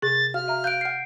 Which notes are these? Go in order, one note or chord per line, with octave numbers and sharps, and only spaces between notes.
C3 G#4 A6
F#4 F5 F6
E5 A#5
F5 F#6 G6 D7
F#5 C7